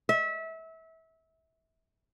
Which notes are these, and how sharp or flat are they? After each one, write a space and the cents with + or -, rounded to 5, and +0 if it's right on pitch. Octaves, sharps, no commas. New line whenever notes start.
E5 -25